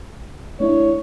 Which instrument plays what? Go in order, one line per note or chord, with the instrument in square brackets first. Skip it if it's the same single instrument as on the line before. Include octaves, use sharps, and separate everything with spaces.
[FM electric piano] A3 D4 E4 [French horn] C#5